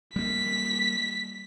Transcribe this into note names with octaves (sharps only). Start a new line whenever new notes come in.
G3 A#3 B6